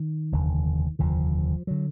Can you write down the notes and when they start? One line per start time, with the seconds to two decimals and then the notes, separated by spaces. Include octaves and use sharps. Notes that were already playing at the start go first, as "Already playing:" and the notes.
Already playing: D#3
0.32 F1 D#2 D3
0.99 F1 D#2 D3 F3
1.67 D3 F#3